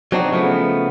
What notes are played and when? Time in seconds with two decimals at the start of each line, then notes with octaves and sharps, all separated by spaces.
0.12 F#3 C4 D4 D#4 F#4
0.32 C#3 F3 A3 B3